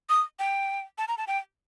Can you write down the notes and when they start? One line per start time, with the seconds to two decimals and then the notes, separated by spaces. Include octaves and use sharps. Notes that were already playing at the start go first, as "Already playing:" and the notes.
0.09 D#6
0.39 G5
0.98 A5
1.08 A#5
1.18 A5
1.27 G5